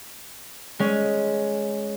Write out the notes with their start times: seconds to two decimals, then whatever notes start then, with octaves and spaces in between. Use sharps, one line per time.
0.79 G#3 C#4